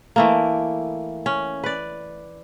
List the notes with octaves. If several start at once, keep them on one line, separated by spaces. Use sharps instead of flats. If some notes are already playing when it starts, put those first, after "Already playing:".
E3 A3 A#3
C#4
B4 D5